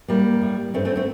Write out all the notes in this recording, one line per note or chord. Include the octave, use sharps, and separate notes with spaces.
A2 G3 A#3
A2
G2 A3 C4
A3 C4
D3
A3 C4